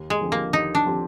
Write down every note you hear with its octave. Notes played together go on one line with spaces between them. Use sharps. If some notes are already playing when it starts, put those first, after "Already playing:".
Already playing: D#2
G#3
D3 F3 C4 G4
A#3
D#2 D#4
D4
D3 F3 C4 G4